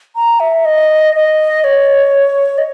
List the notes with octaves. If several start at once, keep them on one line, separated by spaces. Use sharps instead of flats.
A#5
E5
D#5
D#5
C#5
D#5